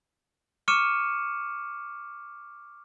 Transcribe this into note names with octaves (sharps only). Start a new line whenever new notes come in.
C#6 D6 F6 C#7 D#7 E7